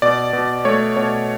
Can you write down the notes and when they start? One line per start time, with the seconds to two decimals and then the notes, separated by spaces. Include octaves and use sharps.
0.02 B2 D5
0.33 B2
0.65 A3 C#5
0.97 B2 C#5